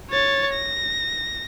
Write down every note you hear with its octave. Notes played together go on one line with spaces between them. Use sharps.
C#5 A6
A#6